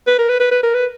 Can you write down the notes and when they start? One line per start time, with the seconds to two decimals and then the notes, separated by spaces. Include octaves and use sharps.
0.07 B4
0.18 A#4
0.29 B4
0.40 B4
0.51 B4
0.63 A#4
0.74 B4